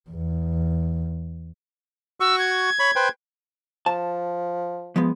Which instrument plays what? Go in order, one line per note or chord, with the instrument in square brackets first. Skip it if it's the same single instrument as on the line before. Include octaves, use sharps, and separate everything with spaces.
[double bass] E2
[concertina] F#4 C#6 [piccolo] E6
[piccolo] G#6
[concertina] C#5 B5
B4 C5 G5
[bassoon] F3 [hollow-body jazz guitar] A5
[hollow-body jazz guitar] F3 G#3 B3